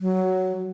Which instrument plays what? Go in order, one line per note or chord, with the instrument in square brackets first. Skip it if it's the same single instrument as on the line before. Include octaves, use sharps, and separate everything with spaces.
[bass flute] F#3